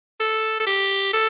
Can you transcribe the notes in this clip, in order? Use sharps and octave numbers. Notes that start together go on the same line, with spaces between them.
A4
A4
G4
A4